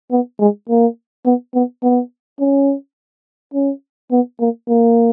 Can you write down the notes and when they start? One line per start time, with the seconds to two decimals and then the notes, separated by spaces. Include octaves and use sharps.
0.11 B3
0.39 G#3
0.69 A#3
1.26 B3
1.54 B3
1.83 B3
2.40 C#4
3.54 C#4
4.11 B3
4.40 A#3
4.68 A#3